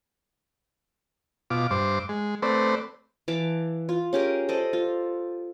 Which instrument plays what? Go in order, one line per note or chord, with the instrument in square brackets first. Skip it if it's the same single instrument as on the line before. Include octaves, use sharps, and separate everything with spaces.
[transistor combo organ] B2 F4 D6
G2 C5 D6
G#3
A3 C4 B4 C5 D5
[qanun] E3 F5 A5 D6
F4
C#4 G4 G#4 A#4
A4 C5 D5 D#5
F4